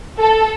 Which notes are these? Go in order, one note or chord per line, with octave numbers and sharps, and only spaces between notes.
A4